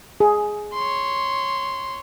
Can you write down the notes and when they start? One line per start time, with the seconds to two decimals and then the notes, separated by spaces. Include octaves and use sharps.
0.20 G#4
0.74 C#5 C6